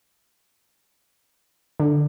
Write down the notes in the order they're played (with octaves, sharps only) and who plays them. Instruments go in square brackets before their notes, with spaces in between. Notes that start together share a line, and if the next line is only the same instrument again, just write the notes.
[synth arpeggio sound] D3